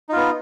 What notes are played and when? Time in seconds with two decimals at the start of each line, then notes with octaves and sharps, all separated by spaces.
0.09 D#4
0.13 F4
0.16 B3